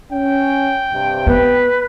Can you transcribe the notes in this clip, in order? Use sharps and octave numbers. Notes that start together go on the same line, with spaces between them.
C#4 G5
G2 C3
B3 B4